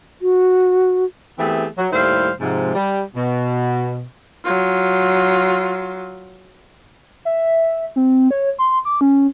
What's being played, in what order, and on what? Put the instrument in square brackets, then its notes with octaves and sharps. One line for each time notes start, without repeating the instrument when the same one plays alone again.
[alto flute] F#4
[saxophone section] E3 A3 B3 C4 G4 G#4
F#3
D#2 A2 G3 E4 C5 F5
G#2 C3 F3
G3
B2
[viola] F#3 F4
[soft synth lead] E5
C4
C#5
C6
D6
C#4